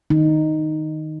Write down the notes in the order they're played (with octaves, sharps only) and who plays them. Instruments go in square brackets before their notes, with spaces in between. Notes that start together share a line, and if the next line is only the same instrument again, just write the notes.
[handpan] D#3 D#4